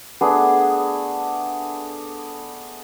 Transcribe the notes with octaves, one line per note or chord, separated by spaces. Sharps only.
A3 B3 D4 G#4